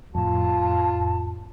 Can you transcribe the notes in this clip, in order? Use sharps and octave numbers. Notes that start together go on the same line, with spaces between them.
F2 A2 F4 A5